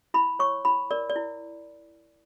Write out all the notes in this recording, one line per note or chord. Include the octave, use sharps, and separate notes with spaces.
E4 B5
C#5 C#6
E4 B5
A#4 D5
D5
E4